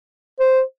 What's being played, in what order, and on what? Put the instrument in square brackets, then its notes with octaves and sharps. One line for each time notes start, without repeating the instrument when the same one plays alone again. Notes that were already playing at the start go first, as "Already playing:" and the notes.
[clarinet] C5